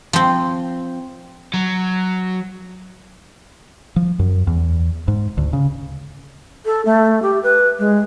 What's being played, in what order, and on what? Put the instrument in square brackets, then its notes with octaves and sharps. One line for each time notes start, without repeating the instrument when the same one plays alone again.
[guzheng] F3 C4
[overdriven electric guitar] F#3
[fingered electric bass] F3
F#2
E2
G#2
D2
C#3
[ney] A4
A3
G4
B4
G#3